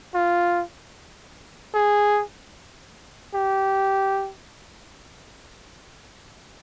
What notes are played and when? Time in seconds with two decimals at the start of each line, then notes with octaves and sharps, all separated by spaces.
0.15 F4
1.74 G#4
3.34 G4